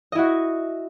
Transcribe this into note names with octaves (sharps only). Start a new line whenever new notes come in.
E4 F#4 D#5